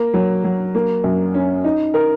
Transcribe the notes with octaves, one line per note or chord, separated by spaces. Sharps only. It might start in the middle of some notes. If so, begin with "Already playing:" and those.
Already playing: A#3
F#3
F#3
A#3
F#2
C#4
D#4
A#4